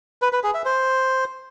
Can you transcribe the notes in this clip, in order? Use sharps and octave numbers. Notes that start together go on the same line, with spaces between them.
B4
B4
G#4
E5
C5